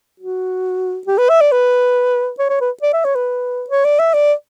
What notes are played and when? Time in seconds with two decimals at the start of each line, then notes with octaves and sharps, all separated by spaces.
0.20 F#4
1.07 G4
1.18 B4
1.29 E5
1.41 D5
1.52 B4
2.39 C#5
2.49 C#5
2.61 B4
2.82 D5
2.93 E5
3.05 C#5
3.15 B4
3.70 C#5
3.84 D5
3.99 E5
4.14 D5